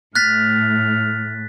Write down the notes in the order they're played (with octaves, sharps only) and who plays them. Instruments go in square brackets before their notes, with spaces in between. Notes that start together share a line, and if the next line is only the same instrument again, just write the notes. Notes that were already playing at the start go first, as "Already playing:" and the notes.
[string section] A2 [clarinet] F6 [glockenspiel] F#6 A6 B6